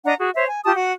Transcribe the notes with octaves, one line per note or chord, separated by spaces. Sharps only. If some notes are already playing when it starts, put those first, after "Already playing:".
D4 D#5 F#5 A#5
F#4 G#4
C5 C#5 E5
G#5
F4 G4 A5 D#6
F#4 F#5